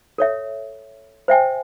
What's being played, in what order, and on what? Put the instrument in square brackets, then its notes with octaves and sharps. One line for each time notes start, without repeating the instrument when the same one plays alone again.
[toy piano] A4 C#5 E5
C5 E5 G5 G#5